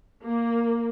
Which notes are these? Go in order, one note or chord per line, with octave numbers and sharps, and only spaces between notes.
A#3